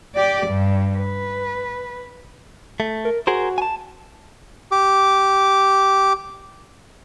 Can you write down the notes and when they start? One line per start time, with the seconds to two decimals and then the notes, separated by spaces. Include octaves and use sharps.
0.15 G4 D5
0.46 G2
0.96 B4
2.80 A3
3.05 A#4
3.27 F#4 G#4 A#4 C5
3.58 G#5 A5
4.72 G4 D6